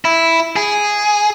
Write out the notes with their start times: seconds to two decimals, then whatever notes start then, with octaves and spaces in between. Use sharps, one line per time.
0.05 E4
0.56 G#4